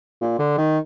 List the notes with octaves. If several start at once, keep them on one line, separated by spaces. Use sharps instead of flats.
A#2
D3
D#3